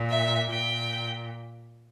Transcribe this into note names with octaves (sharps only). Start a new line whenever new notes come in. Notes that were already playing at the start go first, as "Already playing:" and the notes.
Already playing: A#2
E5
A#2 G5